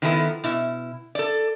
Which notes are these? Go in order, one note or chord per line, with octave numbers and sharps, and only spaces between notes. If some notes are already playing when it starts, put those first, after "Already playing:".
D#3 F3 B3 E4 A4
B2 E4
A4 D5